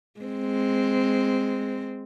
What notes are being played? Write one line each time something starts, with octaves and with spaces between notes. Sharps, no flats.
G#3 C4